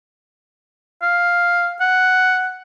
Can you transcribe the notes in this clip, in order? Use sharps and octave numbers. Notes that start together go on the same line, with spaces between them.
F5
F#5